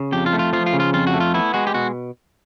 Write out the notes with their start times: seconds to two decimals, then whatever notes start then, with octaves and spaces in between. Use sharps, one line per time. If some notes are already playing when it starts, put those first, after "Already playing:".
Already playing: C#3
0.12 F2 G4
0.26 F4
0.33 A3
0.39 F4
0.53 F3 F4
0.66 F4
0.73 C#3
0.80 F4
0.94 F2 F4
1.07 F#4
1.14 A3
1.20 F4
1.34 B3 E4
1.54 G#3 F#4
1.67 G4
1.74 B2 F#4